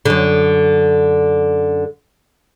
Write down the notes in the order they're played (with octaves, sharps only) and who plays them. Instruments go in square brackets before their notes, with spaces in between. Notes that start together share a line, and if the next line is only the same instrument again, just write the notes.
[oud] F#2 D3